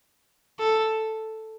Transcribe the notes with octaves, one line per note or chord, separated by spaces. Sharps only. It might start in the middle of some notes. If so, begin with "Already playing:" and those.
A4